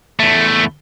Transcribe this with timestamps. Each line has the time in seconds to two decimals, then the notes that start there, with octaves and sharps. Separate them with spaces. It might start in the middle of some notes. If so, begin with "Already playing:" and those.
0.20 E2 A3